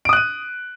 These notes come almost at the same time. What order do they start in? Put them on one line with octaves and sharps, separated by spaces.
D7 D#6 F#6 D#7